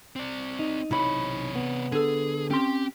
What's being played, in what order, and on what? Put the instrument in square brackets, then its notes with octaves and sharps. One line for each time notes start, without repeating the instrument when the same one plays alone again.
[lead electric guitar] C4 D5
[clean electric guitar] D#4
[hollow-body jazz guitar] B1 E4 B5 [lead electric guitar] C3 C#5
[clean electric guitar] B3
[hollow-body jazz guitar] D3 A4 [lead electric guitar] G#4
[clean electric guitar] C4 C#4 C6 [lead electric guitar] G4 G5